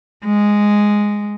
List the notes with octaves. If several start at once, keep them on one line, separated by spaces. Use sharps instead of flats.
G#3